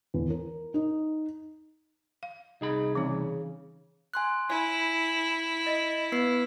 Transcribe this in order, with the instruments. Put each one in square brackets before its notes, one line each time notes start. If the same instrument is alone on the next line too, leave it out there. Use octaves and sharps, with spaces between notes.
[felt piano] E2
A#4
D#4
[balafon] F5
[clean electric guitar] C2 G#4 B5 [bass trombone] D#4
[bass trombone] C#3 [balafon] E3 C4 D#4
[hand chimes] G#5 C6 F#6
[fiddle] E4 [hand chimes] G#5
[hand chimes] D#5
B3 B4 C7